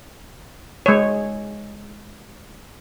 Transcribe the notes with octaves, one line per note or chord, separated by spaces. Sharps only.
G#3 C#5